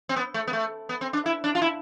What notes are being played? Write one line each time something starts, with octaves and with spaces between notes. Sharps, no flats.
C4
B3
A3
B3
A3
B3
C4
D4
E4
D4
F4
E4